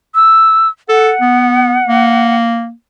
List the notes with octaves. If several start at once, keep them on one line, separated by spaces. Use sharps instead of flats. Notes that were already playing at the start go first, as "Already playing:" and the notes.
E6
A4 F#5
B3
A#3